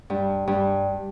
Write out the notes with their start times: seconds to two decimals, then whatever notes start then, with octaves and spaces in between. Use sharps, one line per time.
0.10 G2
0.47 G2